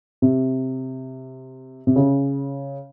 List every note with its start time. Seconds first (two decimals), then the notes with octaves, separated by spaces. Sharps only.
0.22 C3
1.87 C3
1.96 C#3